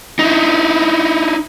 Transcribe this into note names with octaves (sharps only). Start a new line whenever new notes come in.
D#4 E4